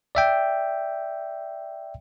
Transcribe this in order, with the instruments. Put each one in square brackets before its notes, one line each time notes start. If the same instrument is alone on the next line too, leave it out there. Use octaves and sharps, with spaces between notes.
[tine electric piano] D5 E5 G5